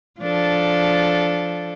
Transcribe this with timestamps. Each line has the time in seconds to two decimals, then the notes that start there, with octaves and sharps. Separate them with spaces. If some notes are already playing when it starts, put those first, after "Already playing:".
0.20 F3 D4 A4